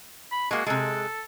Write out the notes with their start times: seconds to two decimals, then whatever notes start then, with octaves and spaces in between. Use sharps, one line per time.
0.32 B5
0.51 G#3 A#3 F#4
0.66 C3 G#3 A4